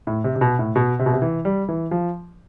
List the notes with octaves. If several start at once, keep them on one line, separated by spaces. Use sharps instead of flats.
A2
C3
C3
B2
A2
B2
C3
B2
C3
E3
G3
E3
F3